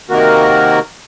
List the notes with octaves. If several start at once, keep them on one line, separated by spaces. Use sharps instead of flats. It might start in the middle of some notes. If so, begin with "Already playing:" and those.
C3 D#3 A#3 F#4 A#4